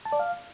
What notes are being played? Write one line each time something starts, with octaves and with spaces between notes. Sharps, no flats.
A5
D5
F5